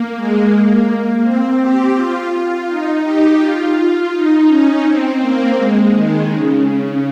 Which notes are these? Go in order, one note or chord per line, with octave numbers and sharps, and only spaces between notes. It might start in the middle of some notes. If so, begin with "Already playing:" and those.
Already playing: A#3
G#3
A#3
A#3
C4
G4
F4
F4
D#4
G4
F4
D#4
C#4
C4
A#3
G#3
D#3
C#3